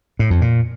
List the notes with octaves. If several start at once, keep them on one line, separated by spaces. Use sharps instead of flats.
A2
F2
A#2